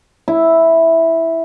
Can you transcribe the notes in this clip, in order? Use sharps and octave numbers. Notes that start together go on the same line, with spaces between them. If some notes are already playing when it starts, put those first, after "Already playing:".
E4